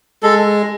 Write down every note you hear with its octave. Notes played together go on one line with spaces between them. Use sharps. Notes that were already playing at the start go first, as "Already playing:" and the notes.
G#3 A4